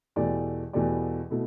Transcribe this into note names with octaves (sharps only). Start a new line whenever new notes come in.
E2 B2 A3 G4 D5
E2 B2 A3 G4 D5
B2 A3 E4